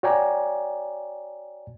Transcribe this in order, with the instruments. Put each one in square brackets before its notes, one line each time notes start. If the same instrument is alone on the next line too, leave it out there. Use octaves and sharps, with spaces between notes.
[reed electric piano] F#4 C#5 D5 G5 G#5 A#5